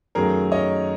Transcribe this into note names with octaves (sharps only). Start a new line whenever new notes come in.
F#2 D#3 F#3 A3 G#4 A#4
C#5 D#5